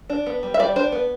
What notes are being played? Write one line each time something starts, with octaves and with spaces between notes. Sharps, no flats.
D4
B3
G3
E5
G3 D5
D4 C5
B3